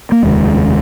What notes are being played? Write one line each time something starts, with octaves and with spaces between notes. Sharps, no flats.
A#3
F1 D#2 C#3 G#3